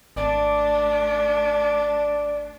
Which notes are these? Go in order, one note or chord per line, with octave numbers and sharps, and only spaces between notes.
G#1 A3 D4 D5